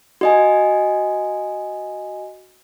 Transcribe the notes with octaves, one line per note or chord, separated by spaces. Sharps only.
F#4 D#5 G#5